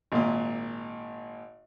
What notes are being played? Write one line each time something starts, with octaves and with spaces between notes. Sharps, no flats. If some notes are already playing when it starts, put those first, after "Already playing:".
G#1 A#2